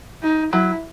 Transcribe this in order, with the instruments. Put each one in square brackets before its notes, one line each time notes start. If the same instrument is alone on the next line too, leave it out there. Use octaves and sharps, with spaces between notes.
[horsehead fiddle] D#4
[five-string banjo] F#3 [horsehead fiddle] E4